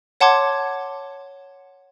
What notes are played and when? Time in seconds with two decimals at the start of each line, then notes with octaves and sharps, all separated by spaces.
0.20 C#5 F#5 A5 C6 D6 G#6